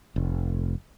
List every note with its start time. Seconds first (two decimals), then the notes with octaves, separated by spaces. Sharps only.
0.16 F1